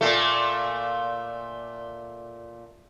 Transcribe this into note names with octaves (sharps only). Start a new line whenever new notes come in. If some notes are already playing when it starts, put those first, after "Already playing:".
A#2 A3